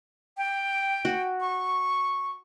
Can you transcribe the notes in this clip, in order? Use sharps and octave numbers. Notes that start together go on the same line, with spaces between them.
G5
F#4
C#6